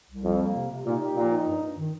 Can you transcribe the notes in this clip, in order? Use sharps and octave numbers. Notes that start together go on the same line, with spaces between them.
C2
F2 G3
A#3
C3
C3
A#2 D#4
G4
A#2 F3
D#4
G2
G2
D#3